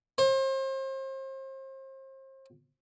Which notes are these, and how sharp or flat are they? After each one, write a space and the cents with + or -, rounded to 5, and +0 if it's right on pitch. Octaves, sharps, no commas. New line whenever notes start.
C5 +35